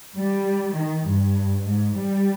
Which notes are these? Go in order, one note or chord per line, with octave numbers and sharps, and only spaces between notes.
G3
D#3
G2
G#2
G3